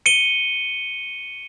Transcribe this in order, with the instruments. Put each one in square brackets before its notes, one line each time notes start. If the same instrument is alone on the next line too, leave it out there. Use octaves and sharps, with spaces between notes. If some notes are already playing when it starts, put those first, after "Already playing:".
[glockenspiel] C#7 D#7 G7